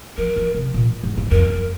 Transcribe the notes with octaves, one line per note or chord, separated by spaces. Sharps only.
F3 A#4
F3
C3
A#2
G#2
G#2
F2 A#4
F2